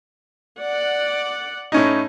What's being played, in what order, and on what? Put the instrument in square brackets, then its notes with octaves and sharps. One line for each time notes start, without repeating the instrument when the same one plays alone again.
[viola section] D5 F#5
[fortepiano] A2 C#4 D#4